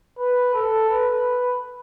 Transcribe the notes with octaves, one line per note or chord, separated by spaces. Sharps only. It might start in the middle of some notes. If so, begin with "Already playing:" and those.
B4
A4
B4